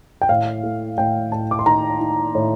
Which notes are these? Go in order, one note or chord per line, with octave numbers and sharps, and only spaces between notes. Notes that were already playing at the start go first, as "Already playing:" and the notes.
G5
A2 F5
A3
A2 G5
A2 A5
D6
C6
D#4 A#5
D#4
A2